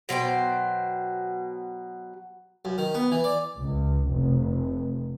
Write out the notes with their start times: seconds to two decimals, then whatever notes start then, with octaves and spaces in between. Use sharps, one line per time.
0.09 B2 F#3 C5 G5
2.65 F#2
2.78 D#3
2.94 B3
3.12 E3
3.24 D5
3.58 C#2
4.07 F1